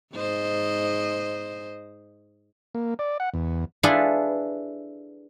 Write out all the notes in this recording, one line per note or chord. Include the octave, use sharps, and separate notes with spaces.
G#2 C5 D#5
A#3
D5
F#5
E2
D4 E4 F4 G#4 A4 B4